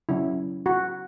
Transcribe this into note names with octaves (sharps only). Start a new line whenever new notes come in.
C#3 F#3 C#4 E4
F#4